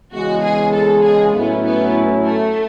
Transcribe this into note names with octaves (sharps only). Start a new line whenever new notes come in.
E2 C#3 G#3 F#4
G#4
A4
G#4
A2 F#3 B3 C#4 E4
B3
A3